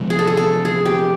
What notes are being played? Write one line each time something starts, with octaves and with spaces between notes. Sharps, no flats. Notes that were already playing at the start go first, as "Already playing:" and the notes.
Already playing: C3 F3 G#3
G#4
A4
G#4
A4
G#4
G4